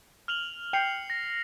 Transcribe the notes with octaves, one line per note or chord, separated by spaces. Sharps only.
F6 F7 F#7
G5 C7 C#7 F7
A#6